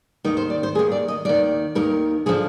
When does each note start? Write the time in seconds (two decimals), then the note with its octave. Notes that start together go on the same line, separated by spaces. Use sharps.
0.25 D#2 D#3 D#4
0.37 C5
0.50 D5
0.63 C5
0.75 D#3 G#4
0.79 D#2
0.92 D5
1.08 D#5
1.25 D#2 D#3 D5
1.75 D#2 D#3 A#4
2.26 D3 F3 G#4